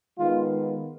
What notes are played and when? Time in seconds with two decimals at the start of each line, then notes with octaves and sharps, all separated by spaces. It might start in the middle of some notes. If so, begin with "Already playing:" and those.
0.17 D#3 G#3 B3 F4